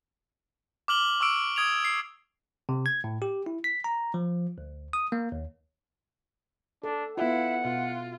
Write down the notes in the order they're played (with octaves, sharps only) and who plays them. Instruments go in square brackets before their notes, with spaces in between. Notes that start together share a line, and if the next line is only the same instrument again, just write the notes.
[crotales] D6 F6 F#7 G7
C#6 D6 E6 D7
D#6 G#6 D7 F7
C7
[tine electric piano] C3
G#6
A2
G4
E4
B6
A#5
F3
D2
D#6
A#3
D#2
[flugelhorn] D4 [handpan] A4
[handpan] B3 F4 [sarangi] E4 [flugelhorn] F#5
[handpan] B2 [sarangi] F4